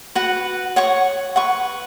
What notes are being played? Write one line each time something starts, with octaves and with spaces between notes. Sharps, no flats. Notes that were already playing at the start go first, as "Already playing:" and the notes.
F#4 B4 F#5
C#5 F#5 C#6
B4 F#5 C#6